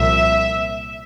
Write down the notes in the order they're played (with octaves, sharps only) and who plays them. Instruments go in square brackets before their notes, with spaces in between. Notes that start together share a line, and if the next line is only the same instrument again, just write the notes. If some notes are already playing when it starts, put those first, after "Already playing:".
Already playing: [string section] C2 A#2 F3 E5